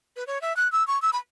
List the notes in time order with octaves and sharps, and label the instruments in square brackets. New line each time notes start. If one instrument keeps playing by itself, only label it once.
[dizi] B4
C#5
E5
F#6
E6
C#6
E6
B5